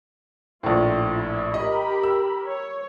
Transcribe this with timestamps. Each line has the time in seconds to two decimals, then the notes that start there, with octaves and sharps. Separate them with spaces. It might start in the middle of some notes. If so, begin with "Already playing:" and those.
0.63 A#1 A2 F4
1.13 E4
1.54 G4 A#4 D#5 B5
2.03 E6
2.46 C#5